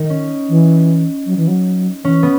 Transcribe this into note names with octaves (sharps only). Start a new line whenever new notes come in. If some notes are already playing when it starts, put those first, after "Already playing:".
Already playing: D#3 D#4
C#4
E3
F#3
E3
F#3
E3 C#4
B3